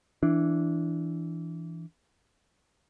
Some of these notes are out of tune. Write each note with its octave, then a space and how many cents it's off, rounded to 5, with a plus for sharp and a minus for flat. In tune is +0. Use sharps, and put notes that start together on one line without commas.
E3 +5 D4 -5